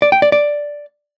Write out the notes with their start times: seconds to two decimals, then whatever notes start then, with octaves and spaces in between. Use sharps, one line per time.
0.02 D5
0.12 G5
0.22 D5
0.32 D5